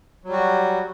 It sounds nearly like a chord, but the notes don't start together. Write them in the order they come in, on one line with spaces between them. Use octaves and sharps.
F#3 G3 F#4